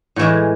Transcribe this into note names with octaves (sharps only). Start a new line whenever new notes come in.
A2 E3 G#3